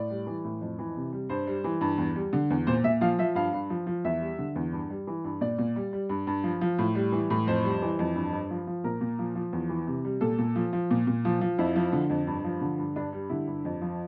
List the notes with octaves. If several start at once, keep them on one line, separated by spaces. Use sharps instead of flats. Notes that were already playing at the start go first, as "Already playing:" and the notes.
Already playing: A2 D5
G3
E3
A2
F2
E3
C3
G3
G2 C5
G3
E3
G2
E2
G3
D3
E2
A#2 C5
A#2 E5
F3 F5
F3 E5
G2 F5
G2
F3
F3
E2 E5
G3
D3
E2
G2
G3
E3
G2
A#2 D5
A#2
G3
G3
G2
G2
F3
F3
A2
G3
E3
A2
F2 C5
G3
E3
F2
G2
G2
F3
F3
A#2 A#4
A#2
F3
F3
E2
E3
C3
G3
A#2 A4
A#2
F3
F3
A#2
A#2
F3
F3
F2 E4
F3
D3
F2
G2
F3
D3
G2
G2 D4
G3
D3 E4
G2
F2
F3